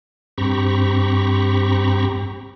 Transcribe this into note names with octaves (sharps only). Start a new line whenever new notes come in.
G2 C4 G4 A#5 B5 C#6